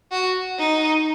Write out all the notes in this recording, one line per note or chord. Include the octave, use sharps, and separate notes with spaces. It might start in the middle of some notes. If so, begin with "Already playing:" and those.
F#4
D#4